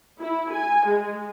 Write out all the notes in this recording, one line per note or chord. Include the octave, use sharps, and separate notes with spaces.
E4
G#5
G#3